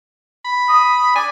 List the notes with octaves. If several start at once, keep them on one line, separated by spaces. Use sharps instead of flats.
B5
D#6
D5 G#5